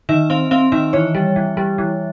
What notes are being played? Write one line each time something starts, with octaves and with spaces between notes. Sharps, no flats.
D#3 E5
C4 F5
C4 F5
D#3 E5
E3 C#5
G3
E3
G3
E3